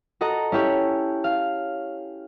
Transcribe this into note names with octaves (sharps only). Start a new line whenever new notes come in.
F#4 A4 D#5 A#5
C#4 E4 G4 C#5
F5